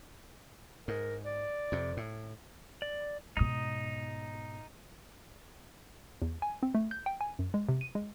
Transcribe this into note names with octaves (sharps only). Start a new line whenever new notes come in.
G#2 A#4
D5
F2 C3
A2
D5
G#2 B2 D#4 D#6
E2
G#5
C4
A3
G6
G5
G#5
F#2
G#3
C3
D#7
G#3